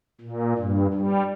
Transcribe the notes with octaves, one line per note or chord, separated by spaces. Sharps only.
A#2
G2
G3